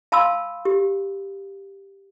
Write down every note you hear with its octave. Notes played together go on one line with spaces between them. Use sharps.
F5 A5 B5 C6 E6
G4